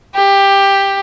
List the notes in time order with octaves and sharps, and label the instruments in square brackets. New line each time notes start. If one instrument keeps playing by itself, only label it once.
[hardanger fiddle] G4